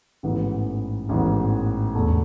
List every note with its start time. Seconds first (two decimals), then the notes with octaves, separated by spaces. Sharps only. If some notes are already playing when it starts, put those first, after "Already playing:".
0.23 A1 G#2 E3 B3
1.09 A1 G#2 E3 B3
1.95 E1 E2 B2 A3